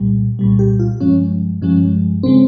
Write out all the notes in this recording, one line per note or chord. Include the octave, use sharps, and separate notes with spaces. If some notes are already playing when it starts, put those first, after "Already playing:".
Already playing: C2 A#2 G3
C2 A#2 G3
G4
F4
G2 F3 G#3 C#4
G2 F3 G#3 C#4
C#3 G#3 C4